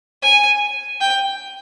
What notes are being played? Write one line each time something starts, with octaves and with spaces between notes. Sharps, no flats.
G#5
G5